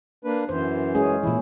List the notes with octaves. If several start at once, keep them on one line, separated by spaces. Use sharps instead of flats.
A#3 D4 B4
F#2 E3 C5
G#3 C#4 G#4
A#2 E3 E4